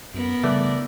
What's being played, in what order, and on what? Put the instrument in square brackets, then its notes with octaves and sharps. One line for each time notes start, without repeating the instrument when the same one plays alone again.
[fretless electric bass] F#2 [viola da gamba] B3 A#4
[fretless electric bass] C#3 G3 [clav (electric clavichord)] E3 A3 [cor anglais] D5